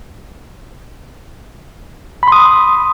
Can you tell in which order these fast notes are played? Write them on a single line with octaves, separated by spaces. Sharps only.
B5 C6 D#6